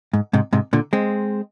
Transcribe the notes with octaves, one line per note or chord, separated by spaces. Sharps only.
G#2
G#2 C3
G#2 C3
A#2 D3
G#3 C4